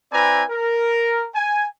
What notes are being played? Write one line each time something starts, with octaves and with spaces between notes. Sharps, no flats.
C4 E4 B4 D5 G#5 A#5
A#4
G#5